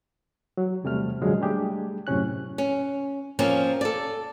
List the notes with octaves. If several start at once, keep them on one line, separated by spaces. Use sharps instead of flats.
F#3
E2 C3 G3 A3 F6
F#2 A#2 D3 F3 F#3 G#3
G3 A3 D4 G4 G#4
F#2 A2 C3 C#4 F#6
C#4
F3 A#3 C4 C#4
A4 D5